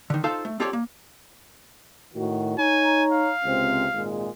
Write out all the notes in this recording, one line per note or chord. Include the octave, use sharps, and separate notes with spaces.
D3 D#3
D#4 F4 A4 C5 F5 A5
A3
C4 F4 G4 A4 C#5 D5
A#3
A2 D#3 F#4
D#4 C#5 G#5 A#5
F5
C#2 C3 C4
G#1 A#2 G#3